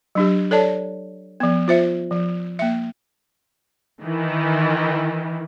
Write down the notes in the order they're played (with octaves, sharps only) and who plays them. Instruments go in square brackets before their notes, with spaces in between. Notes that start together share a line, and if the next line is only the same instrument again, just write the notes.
[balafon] F#3 D4 G4
A4 C#5 D5 A5
F3 B3
F4 C5 E5
F3
A#3 E5
[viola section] D#3 E3